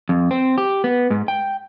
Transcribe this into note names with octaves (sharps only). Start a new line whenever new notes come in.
F2
C4
G4
B3
G#2
G5